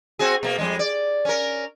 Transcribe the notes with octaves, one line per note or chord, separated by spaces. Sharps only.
C4 F#4 G#4
B2 A#3
F2 G3 G#3
D5
C#4 A#4